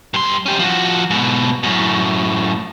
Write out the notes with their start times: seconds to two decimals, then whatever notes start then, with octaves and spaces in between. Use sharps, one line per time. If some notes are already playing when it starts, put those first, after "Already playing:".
0.14 G2 C6
0.46 C#4 G4
0.59 F3 F#4
1.10 G#2 B2
1.63 F#2 A2